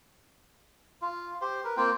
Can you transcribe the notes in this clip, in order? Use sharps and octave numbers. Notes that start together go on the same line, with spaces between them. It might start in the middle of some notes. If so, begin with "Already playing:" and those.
F4
G4 C5 C6
A#4 B4
A#3 C4 F4 G5